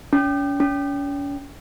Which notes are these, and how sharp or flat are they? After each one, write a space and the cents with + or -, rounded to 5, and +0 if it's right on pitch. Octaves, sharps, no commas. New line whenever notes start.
C#4 +40
C#4 +40